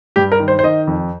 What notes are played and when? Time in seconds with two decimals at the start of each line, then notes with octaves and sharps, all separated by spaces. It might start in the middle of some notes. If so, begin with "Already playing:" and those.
0.16 G2 G4
0.32 A#4
0.40 D#3
0.48 C5
0.59 C5
0.64 D#3 D#5
0.87 F2